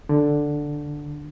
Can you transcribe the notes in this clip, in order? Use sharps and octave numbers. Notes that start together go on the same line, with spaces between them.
D3